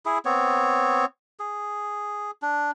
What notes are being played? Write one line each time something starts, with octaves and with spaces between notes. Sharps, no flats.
E4 G#4
B3 C4 C#5
G#4
D4